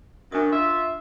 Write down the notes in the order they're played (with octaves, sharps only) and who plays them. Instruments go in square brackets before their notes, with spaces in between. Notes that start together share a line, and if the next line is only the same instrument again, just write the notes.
[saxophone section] F#2 [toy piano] D4 D#6
[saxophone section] F4 E5